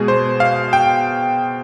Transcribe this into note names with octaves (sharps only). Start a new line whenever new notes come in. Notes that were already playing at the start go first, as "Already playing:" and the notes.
Already playing: B2 G#3 G#4
C5
F5
G5